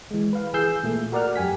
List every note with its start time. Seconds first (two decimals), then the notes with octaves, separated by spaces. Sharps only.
0.11 E3 G#3
0.33 B4 F5
0.53 E3 G#4 E6 G6 C7
0.83 A#2 A3
1.12 F#4 A#4 D5 F#5 F6
1.36 F#2 G4 G#5 B6